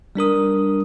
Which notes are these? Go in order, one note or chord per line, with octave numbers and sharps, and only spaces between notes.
G3 D4 A#4 D#6